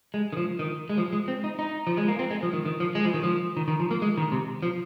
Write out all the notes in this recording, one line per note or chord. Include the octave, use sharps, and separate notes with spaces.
G#3
D#3
F3
D#3
G#3
F3
G#3
C4
D#4
D#4
F3
G#3
A#3
C4
G#3
F3
D#3
D#3
F3
G#3
F3
D#3
F3
D#3
D#3
F3
A#3
G#3
D#3
C3
F3